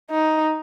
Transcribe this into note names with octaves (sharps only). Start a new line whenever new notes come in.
D#4